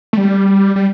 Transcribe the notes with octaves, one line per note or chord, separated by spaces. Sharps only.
A3
G3
G3